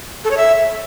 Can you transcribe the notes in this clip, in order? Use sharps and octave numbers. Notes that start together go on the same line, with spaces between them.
A4
C#5
E5